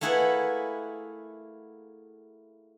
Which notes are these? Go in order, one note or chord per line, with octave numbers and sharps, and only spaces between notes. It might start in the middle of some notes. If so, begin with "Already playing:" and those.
A3 A#3 E4 G#4 B4 F#5